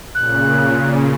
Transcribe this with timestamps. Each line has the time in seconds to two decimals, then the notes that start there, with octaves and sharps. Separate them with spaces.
0.15 A#2 C#3 F#6